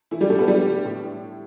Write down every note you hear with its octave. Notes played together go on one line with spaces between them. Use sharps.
E3 A3 E4
G3 G4
A2 A3 A4
B3 B4
G3 A3 G4
D3
A2